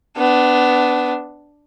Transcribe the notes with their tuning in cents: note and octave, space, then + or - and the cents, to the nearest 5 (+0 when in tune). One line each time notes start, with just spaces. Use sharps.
B3 +20 D4 +0